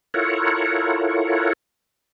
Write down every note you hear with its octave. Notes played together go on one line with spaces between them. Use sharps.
E4 F4 A4 A#4 C#5 F#5